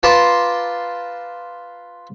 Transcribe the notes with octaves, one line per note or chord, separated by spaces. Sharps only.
F4 B4 A5 A#5 C6 D6